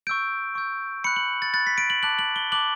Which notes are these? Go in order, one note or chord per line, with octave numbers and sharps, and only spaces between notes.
C#6 E6 G6 D7
C#6 E6 G6
B5 F#6 C#7
F#7
A6
B5 F#6 A6
B6
D7
F#7
A5 D6 F#6 F#7
F#7
G7
A5 D6 F#6 F#7